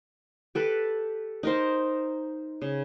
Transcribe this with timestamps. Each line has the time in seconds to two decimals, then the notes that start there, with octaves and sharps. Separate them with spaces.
0.55 G4 A4 B4
1.43 D#4 A#4 C5
2.62 C#3